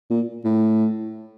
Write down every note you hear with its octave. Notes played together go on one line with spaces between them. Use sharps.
A#2
A2